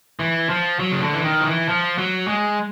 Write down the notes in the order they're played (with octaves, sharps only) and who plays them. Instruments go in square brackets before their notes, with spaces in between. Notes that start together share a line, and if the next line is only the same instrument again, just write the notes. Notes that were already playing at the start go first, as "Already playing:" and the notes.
[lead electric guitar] E3
F3
F#3
C#3
D3
E3
D#3
F3
E3
F3
F#3
G#3